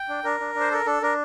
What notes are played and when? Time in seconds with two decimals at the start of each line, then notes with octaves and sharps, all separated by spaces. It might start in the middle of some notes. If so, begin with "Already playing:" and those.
Already playing: G5
0.09 D4
0.24 D4 A#4
0.40 D4
0.55 D4
0.60 C5
0.71 A4 A#4
0.86 D4 A4
1.02 D4 A#4